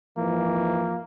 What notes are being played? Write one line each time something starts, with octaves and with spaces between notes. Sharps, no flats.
F2 G#2 E3 F3 A#3